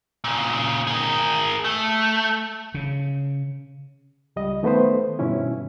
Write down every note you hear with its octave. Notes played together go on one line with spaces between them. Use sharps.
A#2 C#3
G#4 A#4
A3
C#3
C#2 G3 D#5
D#3 A3 B3 B4 C5
G2 B2 D#3 C#4 E4